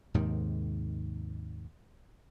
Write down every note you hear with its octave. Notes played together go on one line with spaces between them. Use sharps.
D#2 G#2 C3 D#3